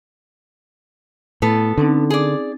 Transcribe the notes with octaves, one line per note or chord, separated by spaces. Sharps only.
A2 B3 A4
D3 C4 C#4 D#4
G#4 D5